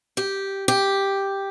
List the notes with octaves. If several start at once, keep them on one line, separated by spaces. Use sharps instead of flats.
G4
G4